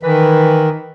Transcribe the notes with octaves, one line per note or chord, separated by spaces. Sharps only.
D#3 E3 B4